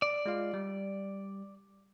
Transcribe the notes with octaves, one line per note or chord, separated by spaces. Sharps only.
D5
G#3 F4 F5
G3